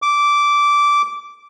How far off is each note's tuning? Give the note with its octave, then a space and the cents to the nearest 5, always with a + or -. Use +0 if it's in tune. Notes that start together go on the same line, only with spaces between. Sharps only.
D6 -10